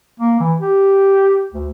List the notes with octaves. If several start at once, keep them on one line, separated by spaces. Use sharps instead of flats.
A#3
E3
G4
D2